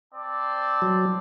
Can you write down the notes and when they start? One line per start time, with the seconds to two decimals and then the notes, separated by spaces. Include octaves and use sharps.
0.13 C4 D5 A5
0.82 F#3